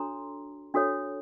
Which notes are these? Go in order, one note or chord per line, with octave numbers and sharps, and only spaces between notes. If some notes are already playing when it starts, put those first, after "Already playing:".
Already playing: D4 F#4 A4 C#5 A#5 C6
D4 F#4 A4 C#5